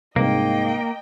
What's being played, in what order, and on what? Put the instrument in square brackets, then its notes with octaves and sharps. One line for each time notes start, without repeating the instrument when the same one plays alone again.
[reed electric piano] C2 [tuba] G#2 [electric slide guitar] A#3 [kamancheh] D#5 G5